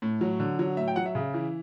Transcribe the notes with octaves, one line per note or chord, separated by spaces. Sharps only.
A2
F#3
D3
F#3
A2 E5
G5
F#3 F#5
E5
C#3
E3